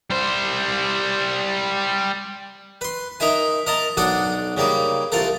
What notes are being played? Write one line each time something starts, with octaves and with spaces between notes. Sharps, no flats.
G3 C5
B4 C6
D#4 A#4 E5 G#5
A#4 D#5 A5 A#5
B1 D4 A4 D5 F#5 D#6
C#3 G3 A#3 D#4
C2 F4 A4 A#4